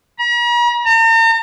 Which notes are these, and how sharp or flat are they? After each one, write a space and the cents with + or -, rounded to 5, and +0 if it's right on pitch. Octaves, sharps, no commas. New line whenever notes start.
A#5 +45
A#5 -45